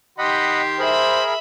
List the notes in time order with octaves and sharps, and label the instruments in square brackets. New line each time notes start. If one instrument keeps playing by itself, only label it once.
[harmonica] D#3 G4 C6 [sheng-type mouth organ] D#5 F#5 B5
[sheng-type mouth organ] G#4 A#4 [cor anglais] C5 [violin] E5 B5